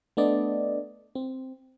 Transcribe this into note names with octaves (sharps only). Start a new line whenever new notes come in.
A3 B3 D4 D5 D#5
C4